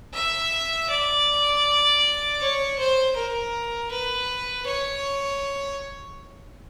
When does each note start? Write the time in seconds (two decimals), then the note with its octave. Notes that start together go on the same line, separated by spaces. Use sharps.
0.14 E5
0.89 D5
2.40 C#5
2.78 C5
3.15 A#4
3.91 B4
4.66 C#5